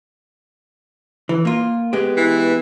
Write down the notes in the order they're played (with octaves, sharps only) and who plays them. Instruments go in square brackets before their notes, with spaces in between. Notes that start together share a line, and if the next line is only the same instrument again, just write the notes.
[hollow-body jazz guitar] E3
A#3 F4
G#3 B3 G4
[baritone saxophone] E3